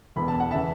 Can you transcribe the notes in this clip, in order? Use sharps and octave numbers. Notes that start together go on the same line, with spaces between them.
E1 E2 E3 B5
A5
F#5
C#3 E3 E5 A5